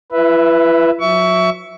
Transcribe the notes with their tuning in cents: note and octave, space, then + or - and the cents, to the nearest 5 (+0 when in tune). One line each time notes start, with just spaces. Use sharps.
E4 +35 B4 +0 E5 +0
F#3 -30 E5 +0 C#6 +25